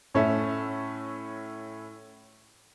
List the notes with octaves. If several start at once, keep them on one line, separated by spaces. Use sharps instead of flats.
A2 C#4 A4 E5